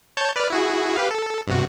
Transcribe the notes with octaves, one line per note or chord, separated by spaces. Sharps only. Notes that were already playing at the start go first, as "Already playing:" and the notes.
C#5 A5 G6
B4 D5 F6
E4 F#4 G#4
G4 B4 F5
A4
G2 C3 F#4